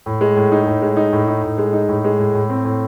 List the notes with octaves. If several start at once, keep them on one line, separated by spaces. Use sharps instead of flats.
A2
G#3
A2
D#4
A2
G#3
D#4
A2
D#4
A2
G#3
D#4
A2
G#3
A2
A2
C4
A2